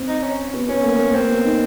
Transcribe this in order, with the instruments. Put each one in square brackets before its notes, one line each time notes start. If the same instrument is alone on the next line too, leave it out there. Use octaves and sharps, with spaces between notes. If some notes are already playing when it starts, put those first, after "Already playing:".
Already playing: [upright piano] C4
[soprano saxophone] D#4
C#4
[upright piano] B3
[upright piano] B3 [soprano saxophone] C#4
[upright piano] A#3
A#3
[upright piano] A#3 [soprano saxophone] C4
[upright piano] B3
D#4